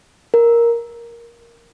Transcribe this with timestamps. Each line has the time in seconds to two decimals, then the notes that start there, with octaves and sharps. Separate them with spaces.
0.34 A#4